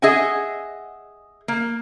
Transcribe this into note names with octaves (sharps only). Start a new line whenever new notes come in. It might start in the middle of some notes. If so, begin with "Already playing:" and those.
G#4 D#5 E5 F#5 G#5
A#3